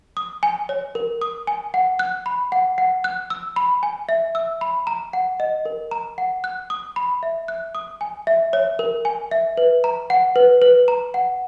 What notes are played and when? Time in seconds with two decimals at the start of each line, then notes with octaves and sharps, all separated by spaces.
0.17 D#6
0.43 G#5
0.69 C#5
0.95 A#4
1.21 D#6
1.47 G#5
1.74 F#5
1.99 F#6
2.26 B5
2.52 F#5
2.78 F#5
3.04 F#6
3.30 E6
3.56 B5
3.83 G#5
4.09 E5
4.35 E6
4.61 B5
4.87 A#5
5.13 F#5
5.40 D#5
5.65 A#4
5.91 A#5
6.18 F#5
6.44 F#6
6.70 D#6
6.96 B5
7.23 E5
7.48 F#6
7.75 D#6
8.01 G#5
8.27 E5
8.53 C#5
8.79 A#4
9.05 G#5
9.31 E5
9.57 B4
9.84 A#5
10.10 F#5
10.36 B4
10.62 B4
10.88 A#5
11.14 F#5